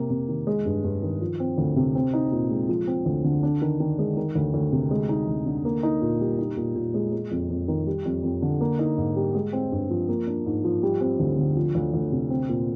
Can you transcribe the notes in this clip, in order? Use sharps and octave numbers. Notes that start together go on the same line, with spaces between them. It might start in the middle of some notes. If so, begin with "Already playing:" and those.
Already playing: C3 A#3
C3
D#3
G#3
G2
G2
D#3
F3
C4
D2
C3
C4
D#4
A#2
G#3
F3
C4
D2
D3
D4
D#3
D#3
G#3
D#3
D2
D2
C3
G#3
D#4
D2
D3
A#3
D#4
A#2
G3
D#4
A#2
A#2
G#3
G#3
F2
F2
D#3
G3
F2
F2
D3
A#3
D#4
G#2
G3
G#3
C4
G2
F3
A#3
D4
G#2
F3
G3
C4
D2
D3
F3
D2
D2
C3
C4
A#2